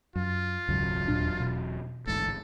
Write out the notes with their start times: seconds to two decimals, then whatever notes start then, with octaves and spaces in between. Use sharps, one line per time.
0.16 F#2 F4
0.69 E1 C#2 G#2 F#3
1.08 D#2 A#2 D4
1.40 B2
2.07 D1 A1 G#2 A4